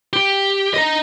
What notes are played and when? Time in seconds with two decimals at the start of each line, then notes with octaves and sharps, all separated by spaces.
0.13 G4
0.74 D#5 A#5